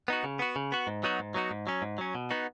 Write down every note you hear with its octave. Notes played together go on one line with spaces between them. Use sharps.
B3 D#4 F#4
C#3
B3 F#4
C#3
B3 F#4
G#2
F#3 B3 D#4 F#4
G#2
F#3 B3 D#4 F#4
G#2
F#3 C#4
G#2
F#3 C#4
B2
B3 D#4 F#4